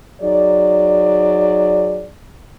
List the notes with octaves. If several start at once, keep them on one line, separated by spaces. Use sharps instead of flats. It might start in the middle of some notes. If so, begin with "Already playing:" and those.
F#3 D#4 G#4 D5